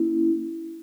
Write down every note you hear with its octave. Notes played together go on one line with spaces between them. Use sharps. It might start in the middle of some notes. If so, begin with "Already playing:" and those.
Already playing: A#3 C#4 E4